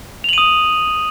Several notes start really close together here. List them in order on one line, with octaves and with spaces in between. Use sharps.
F7 F#7 D#7 D#6